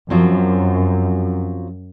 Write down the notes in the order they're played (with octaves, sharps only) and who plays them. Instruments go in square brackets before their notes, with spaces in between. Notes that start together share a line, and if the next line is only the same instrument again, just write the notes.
[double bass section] F#2 [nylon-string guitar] F3 F#3 C4